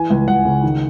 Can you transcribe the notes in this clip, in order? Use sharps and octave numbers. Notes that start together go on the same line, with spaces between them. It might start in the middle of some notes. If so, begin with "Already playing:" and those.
Already playing: E3 G#5
C#2
C#2 F#5
C#3
D#3